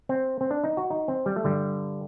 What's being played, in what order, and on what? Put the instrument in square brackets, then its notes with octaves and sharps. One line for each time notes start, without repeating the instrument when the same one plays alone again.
[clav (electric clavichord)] C4
C4
D4
D#4
F#4
D#4
C4
G3
A3
G2 D3 G3